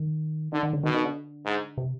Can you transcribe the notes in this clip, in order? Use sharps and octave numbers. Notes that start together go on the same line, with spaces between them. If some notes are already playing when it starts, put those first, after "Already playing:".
Already playing: D#3
D3 D#3
D#3
D3
B2 D#3
D#3
D3
G#2
C3